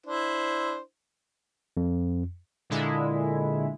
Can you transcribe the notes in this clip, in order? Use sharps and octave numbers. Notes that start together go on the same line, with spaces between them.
D4 E4 C5
F2
A#2 D3 G#3 E4